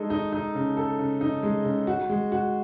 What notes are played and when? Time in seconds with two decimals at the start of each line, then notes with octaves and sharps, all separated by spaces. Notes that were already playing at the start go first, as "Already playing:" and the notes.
Already playing: G#3 D#4 A4
0.10 D#4
0.33 D#4
0.55 C#3
0.77 A4
0.98 C#3
1.21 D#4
1.43 G#3
1.64 C#3
1.87 F#4
2.09 G#3
2.32 F#4